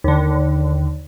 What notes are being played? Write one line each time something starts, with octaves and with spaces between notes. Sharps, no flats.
D#2 D3